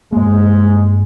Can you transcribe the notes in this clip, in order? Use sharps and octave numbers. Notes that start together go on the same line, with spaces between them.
G2 G#3 A#3